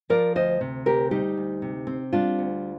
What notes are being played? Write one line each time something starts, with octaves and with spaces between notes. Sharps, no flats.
F3 A#4 D5
D2 C5 D#5
C3
D2 G4 A#4
G3 D#4 G4
D2
C3
C4
G3 D4 F4
D2